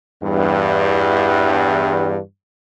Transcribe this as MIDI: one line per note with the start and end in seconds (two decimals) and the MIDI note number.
0.23 2.19 40
0.23 2.19 43